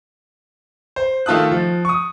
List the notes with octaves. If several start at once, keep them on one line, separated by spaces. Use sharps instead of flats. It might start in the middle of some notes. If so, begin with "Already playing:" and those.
C5
D#3 A3 F4 A5 D#6 F#6
F3
C#6 D#6